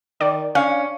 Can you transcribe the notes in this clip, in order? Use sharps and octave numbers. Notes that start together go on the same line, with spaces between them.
D#3 D5
C#4 D4 F5